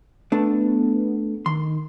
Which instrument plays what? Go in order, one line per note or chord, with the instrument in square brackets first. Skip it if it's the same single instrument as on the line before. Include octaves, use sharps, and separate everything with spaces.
[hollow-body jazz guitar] A3 D4 [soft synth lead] B3
[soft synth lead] D#3 [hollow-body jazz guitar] C6